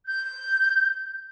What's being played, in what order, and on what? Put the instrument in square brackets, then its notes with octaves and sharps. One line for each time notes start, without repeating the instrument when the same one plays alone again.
[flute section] G6